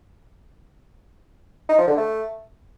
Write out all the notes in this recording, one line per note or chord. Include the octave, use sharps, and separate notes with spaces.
D#4
F3
D3
A3